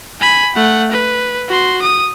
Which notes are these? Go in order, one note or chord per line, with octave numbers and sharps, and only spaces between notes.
G#5 B5
A3 F#5
B4
F#4 C6
D#6